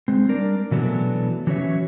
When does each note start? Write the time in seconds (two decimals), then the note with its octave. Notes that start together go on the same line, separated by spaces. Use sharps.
0.08 G#3 C4
0.28 G3 D4 A#4 D5
0.71 B2 E3 F#3 A3 B3 D4
1.47 E3 F#3 C#4 F#4 C#5 E5